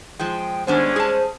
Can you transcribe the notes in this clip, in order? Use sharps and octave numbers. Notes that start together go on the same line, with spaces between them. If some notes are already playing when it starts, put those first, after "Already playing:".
F3 G#3 G5
D#3 G3 G#3 B3 C#4 D4 C5
G#4 A5